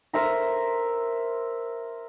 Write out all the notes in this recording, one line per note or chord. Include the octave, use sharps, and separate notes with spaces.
A#4 C5 E5 A#5